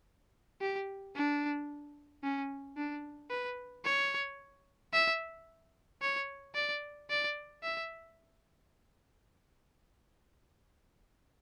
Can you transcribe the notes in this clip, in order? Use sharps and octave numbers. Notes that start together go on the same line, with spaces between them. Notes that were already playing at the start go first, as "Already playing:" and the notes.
G4
D4
C#4
D4
B4
C#5
E5
C#5
D5
D5
E5